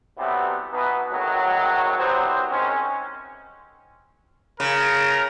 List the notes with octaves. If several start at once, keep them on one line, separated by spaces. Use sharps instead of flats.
C3 E3 F#3 G3 A3 B3
B2 E3 B3 D#4 B4
G#1 A2 D#3 F#3
C2 C3 F#3 B3 C5
D#3 G#3 C4 C#4
C#3 A#4